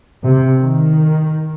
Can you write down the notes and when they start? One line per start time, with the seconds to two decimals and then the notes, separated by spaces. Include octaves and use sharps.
0.23 C3
0.59 D#3